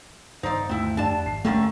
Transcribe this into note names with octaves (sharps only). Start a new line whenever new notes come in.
G2 D#3 G3 D#4 C5 D5 A#5 C6
D2 C4 E4
F2 G3 D4 D5 A5
G#1 C7
F#2 D3 G3 A3 A#3 C#4 G4